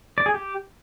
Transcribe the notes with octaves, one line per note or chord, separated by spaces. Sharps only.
D5
G#4
G4